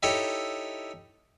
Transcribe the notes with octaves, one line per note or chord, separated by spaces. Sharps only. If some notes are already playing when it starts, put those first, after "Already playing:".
D#4 E4 G4 A4 C#5